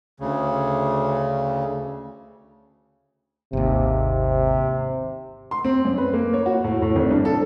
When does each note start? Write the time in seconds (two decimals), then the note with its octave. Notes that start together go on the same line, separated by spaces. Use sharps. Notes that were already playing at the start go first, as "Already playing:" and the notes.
0.20 D2 C#3
3.53 G#1 D#2 C3
5.51 C6
5.65 C4
5.85 F#2
5.98 B4
6.13 A#3
6.34 C#5
6.46 F#4
6.64 A2
6.82 A2
6.96 G#1
7.11 G2
7.25 A4